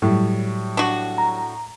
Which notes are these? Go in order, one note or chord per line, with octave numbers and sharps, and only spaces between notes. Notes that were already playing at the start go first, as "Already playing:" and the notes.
A2 F#3 G3
D4 F#4
A#5